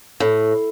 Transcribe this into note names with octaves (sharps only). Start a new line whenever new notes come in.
A2